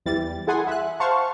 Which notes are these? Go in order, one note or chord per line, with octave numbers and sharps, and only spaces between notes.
E2 E3 G3 A6
E4 G#4 F#5 G#5 C6
E5 F#6
C5 F5 F#5 A5 C#6